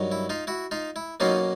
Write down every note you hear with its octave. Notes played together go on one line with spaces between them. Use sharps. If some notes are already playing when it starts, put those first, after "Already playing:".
Already playing: G2 D#3 F#3
E4
D#4 F4
E4 F#4
D#4 F4
E4
B2 F#3 A#3 C#4 D#4 F4